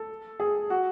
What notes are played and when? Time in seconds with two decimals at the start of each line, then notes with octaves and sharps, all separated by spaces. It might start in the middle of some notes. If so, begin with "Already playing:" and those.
Already playing: A4
0.40 G#4
0.70 F#4